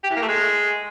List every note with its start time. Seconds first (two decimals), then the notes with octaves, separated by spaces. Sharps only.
0.04 G4
0.10 E3
0.16 A#3
0.22 A3
0.28 G#3